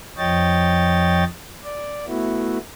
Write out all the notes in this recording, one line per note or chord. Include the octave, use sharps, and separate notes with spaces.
F2 F3 C#5 D#5 G5 A6
D5
A3 B3 E4 F#4